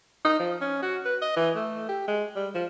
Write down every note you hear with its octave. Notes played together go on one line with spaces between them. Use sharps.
D#4
F3
C#4
F#4
B4
D#5
E3
A3
G4
G#3
G3
F3